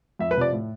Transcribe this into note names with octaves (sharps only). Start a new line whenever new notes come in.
F2 E5
B4
C3 F3 D5
A2